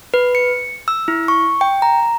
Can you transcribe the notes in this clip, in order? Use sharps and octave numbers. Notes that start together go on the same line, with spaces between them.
B4
C#7
E6
E4
C#6
G5
A#5